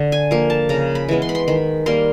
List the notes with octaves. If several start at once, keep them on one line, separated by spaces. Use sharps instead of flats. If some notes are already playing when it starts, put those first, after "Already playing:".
Already playing: D3
G#5
F3 A#3
A5
C#3 A#5
B5
E3 G#3 B3
C6
B5
C6
D#3 B5
G3 A#3 C6